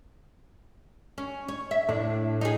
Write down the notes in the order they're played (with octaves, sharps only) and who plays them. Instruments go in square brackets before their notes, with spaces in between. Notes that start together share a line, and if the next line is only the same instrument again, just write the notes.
[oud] C#4
C#5
E5
[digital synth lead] A2 [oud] D4
[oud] D#4 G#4